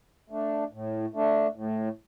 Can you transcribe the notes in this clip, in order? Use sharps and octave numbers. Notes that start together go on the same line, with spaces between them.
A3 D4
A2
A3 D4
A2